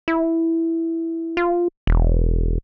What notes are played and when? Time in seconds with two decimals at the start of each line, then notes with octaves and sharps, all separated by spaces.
0.08 E4
1.37 F4
1.87 E1